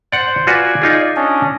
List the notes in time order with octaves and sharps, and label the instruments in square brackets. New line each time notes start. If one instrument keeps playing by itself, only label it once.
[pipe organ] C5 [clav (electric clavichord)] D5 F#5
[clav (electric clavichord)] F4 F#4 B4 [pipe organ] D5 G#5
[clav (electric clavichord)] D#4 F4 G#4
[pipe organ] C#4 D4 D#5